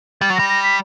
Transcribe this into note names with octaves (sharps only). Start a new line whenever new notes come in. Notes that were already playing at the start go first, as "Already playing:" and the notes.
G3 A6
F#3
G3 A#6
A#6
B6